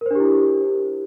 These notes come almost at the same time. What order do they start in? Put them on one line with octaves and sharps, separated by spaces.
A#4 C5 D4 G4 E4